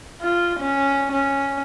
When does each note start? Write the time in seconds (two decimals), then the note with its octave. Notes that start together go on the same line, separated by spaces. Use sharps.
0.22 F4
0.60 C#4
1.12 C#4